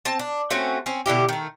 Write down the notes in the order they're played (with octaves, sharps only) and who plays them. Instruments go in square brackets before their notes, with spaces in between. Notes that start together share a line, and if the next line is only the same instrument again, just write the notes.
[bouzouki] C4 A5
D4
A3 C4 C#4 F#4
C4 C#4
B2 D3 E4 G4
D#3 A3